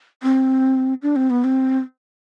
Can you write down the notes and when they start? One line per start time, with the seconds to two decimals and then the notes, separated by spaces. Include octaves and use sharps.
0.23 C4
1.02 D4
1.16 C4
1.30 B3
1.44 C4